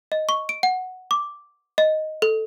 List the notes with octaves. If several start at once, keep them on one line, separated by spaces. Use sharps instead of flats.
D#5
C#6
D7
F#5
D6
D#5
A4